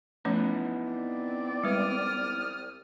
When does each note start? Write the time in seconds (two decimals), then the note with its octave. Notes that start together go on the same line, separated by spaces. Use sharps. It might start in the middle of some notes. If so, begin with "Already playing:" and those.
0.25 F3 A3 B3 C#4 D#4 E4
0.89 C4 D5
1.64 C2 G3 G#3 B4 D#6 F6